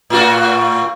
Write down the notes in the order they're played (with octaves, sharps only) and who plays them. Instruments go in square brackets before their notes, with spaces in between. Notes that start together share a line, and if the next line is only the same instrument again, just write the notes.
[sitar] A2 F4 F#4